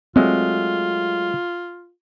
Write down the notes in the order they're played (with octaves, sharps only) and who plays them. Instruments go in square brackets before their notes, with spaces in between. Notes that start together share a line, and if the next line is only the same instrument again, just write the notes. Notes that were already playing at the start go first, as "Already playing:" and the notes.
[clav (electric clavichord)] F#3 G#3 A3 [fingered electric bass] C4 [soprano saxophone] F4